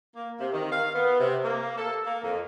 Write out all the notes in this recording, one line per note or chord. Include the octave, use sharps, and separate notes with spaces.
A#3
C3
D#3
F5
B3
C3
A#3
A4
A#3
F2